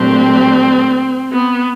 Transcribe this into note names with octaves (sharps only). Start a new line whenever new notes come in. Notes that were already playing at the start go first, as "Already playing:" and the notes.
Already playing: A#2 F#3 A3 C4 D4 G4
B3